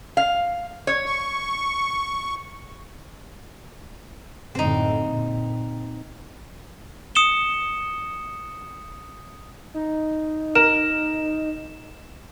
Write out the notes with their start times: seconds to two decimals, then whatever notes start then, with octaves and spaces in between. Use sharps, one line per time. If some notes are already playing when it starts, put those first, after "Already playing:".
0.17 F5
0.87 C#5
1.06 C#6
4.55 F#1 A2 D3 C4 D#4
5.07 A#2
7.15 D#6 C#7 E7 G7
9.74 D#4
10.55 A#4 E7